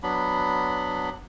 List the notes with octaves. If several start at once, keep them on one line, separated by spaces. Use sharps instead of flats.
F#3 B3 D4 B5